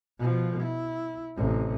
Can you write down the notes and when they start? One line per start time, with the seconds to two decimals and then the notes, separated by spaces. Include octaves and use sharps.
0.18 B2 F3
0.63 E4
1.36 A1 C3